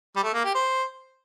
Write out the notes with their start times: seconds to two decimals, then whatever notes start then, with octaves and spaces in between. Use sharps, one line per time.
0.16 G3
0.23 A3
0.33 A#3
0.44 G4
0.55 C5